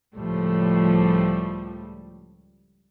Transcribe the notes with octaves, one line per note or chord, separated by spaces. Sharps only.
C#2 A2 F3 G3 A3